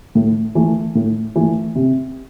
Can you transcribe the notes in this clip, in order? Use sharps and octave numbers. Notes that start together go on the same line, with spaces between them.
A2
E3 A3
A2
E3 A3
C3